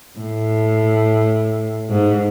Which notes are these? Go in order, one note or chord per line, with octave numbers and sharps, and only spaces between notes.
A2
G#2